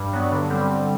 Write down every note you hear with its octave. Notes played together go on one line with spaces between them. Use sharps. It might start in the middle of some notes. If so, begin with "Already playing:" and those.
Already playing: G2
F#3 B3
D3
G3 C4